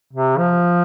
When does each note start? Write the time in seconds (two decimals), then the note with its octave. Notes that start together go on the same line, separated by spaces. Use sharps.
0.13 C3
0.38 F3